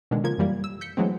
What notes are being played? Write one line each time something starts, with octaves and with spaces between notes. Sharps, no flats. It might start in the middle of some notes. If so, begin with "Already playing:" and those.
B2 D3 D#3 G#3
C#3 F3 A#3 G#6
F#2 E3 G3 A#3
E6
G6 B6 C#7
E3 F#3 G#3 A3 C4